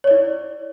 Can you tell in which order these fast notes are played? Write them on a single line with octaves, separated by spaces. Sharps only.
C#5 D5 E4